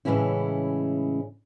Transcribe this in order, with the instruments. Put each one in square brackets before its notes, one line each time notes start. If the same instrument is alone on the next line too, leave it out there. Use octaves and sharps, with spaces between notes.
[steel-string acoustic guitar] A2 C#3 E3 G#3 C#4 E4